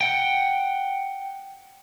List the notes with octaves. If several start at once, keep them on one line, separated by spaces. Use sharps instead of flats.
F#5 G5